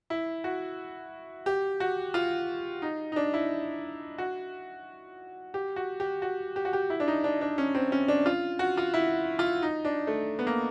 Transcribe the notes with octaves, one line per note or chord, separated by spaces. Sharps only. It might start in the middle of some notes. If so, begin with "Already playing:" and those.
E4
F#4
G4
F#4
F4
D#4
D#4
D4
E4
F#4
G4
F#4
G4
F#4
G4
F#4
G4
E4
D4
D#4
D4
D4
C#4
C4
C#4
D4
F4
F#4
F4
E4
F4
D#4
D4
A3
B3
A#3